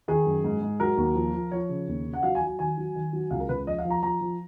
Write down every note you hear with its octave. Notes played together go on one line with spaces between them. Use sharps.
D#3 G#4
F#2
G#2
G#2
F#3 A#4
D#2
F3
F3
F3 C#5
C#3
D#2
C#3
F#5
F#3 F5
G#5
F#3
G#5
D#3 G#5
F#3
D#3
F#3
C#2 F5
A#4
C#2 B4
F3 D#5
F5
F3
A#5
F3 A#5
F3